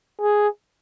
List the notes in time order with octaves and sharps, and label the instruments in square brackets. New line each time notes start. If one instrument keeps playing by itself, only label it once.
[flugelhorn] G#4